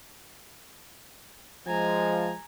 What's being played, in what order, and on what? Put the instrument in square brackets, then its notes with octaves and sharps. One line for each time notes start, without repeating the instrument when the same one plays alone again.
[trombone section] F3 G#3 [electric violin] G#5 A#5